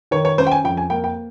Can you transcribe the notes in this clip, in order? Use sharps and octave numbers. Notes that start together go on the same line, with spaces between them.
D#3 C#5
C#5
C#4 C5
G5
G#5
F2 G5
G#5
A#3 G5
G5